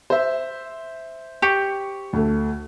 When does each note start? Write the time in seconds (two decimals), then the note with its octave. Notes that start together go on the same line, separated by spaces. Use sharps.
0.10 C5 E5
1.42 G4 C#6 C#7
2.13 D2 A3